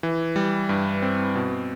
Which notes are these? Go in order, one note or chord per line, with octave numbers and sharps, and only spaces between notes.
E3
G3
G2
C4
B2